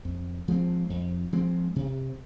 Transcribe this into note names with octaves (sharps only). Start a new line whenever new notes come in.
F2
F3 G#3 C4
F2
F3 G#3 C4
C3